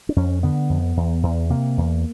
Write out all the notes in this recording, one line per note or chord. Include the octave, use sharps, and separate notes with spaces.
D4
F2 C#4
D3 B3
F2
E2
E2
C3 A#3
E2